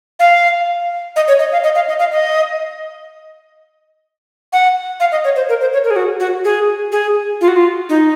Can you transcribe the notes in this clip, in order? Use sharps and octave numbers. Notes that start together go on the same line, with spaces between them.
F5
D#5
C#5
D#5
F5
D#5
F5
D#5
F5
D#5
F#5
F5
D#5
C#5
C5
A#4
C5
C#5
A#4
G#4
F#4
F#4
G#4
G#4
F4
F#4
F4
D#4